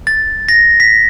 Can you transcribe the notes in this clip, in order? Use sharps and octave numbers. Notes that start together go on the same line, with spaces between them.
A6
A#6
B6